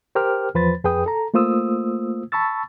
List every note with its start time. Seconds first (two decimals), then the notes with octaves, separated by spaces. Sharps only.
0.15 G4 A#4 C5 G5 D6 F6
0.55 E2 F3 B4 C5 B5 A6
0.84 F2 G#4 B4 G5 D#6
1.06 A4 A#5
1.34 A3 A#3 F4 C5 D#6 E6
2.32 A5 B5 C#6 E6 A6